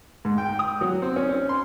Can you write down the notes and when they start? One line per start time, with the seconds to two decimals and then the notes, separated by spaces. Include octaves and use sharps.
0.25 G#2
0.38 G5
0.59 D#6
0.81 F#3
1.02 C4
1.16 C#4
1.29 C#4
1.49 C6